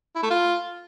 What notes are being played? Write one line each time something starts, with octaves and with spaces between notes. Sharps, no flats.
E4
A3
F4